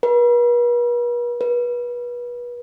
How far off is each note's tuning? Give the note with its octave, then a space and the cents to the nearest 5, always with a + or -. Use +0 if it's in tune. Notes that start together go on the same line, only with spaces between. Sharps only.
B4 -45
B4 -30